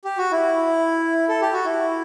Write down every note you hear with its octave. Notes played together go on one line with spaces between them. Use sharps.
G4
F#4
E4
A4
G4
F#4
E4